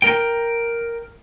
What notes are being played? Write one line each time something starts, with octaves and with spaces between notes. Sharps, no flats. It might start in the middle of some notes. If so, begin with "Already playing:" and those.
A#4 G5